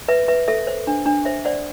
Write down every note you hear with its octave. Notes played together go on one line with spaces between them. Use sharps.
B4 E5
B4 E5
A4 E5
C5
D4
D4
C5 E5
C5 D5 F#5